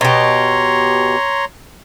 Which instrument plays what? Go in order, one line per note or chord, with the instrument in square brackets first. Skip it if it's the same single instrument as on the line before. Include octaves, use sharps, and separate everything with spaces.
[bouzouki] B2 G4 [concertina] C#5 A#5 C6